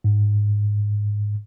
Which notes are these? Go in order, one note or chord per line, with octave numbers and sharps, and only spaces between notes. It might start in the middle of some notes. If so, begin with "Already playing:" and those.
G#2